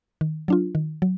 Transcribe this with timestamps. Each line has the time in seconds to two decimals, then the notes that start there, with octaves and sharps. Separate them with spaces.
0.21 D#3
0.48 F#3 D4 F4
0.75 D#3
1.02 F#3